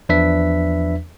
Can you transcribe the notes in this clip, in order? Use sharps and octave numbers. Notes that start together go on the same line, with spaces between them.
E2 F3 D4 B4 E5 B6